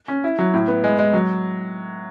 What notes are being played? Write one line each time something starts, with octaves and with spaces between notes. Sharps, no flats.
C#4
E4
F#3
A2
B3
G#3
G#3
F#3